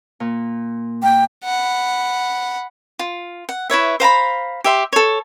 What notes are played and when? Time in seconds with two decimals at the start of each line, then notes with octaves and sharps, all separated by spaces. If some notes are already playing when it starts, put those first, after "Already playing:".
0.20 A#2
1.03 A#3 G5
1.44 F#5 B5
2.99 F4
3.49 F#5
3.70 E4 B4 C#5 E5
4.00 C5 F5 A#5 B5
4.64 G4 E5 C6
4.93 A4 C#5